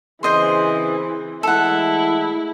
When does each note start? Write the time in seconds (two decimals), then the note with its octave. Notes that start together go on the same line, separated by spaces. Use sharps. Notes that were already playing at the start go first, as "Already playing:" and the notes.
0.23 C#3 E3 C4 G#4 C5 D#5 C6
1.43 E3 G#3 A3 E4 A4 F#5